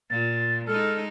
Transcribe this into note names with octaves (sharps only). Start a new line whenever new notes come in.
A#2 A6
G#3 D#4 A4 F6